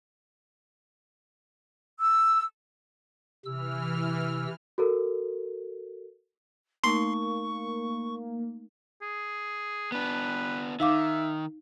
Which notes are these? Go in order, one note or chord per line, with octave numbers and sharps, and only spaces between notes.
E6
C3 E3 E6 F6
F#4 A4 A#4
A3 A#3 D#4 C6 C#6
G#4
B3 D4 B4
D#3 D#4 E5 F5 D6